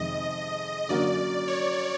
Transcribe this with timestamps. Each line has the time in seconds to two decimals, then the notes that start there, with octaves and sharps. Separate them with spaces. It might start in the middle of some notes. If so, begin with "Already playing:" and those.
Already playing: F2 C3 D#3 G#3 D#5
0.89 D3 F#3 A#3 C#4 F#4 D5
1.48 C#5